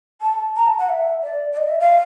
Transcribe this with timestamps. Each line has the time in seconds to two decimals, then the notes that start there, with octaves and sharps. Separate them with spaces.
0.22 A5
0.56 A#5
0.66 A5
0.78 F#5
0.89 E5
1.23 D5
1.52 D5
1.57 D#5
1.68 E5
1.80 F5